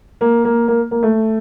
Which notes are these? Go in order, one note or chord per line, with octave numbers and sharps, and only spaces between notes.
A#3
A#3
A#3
A#3
A3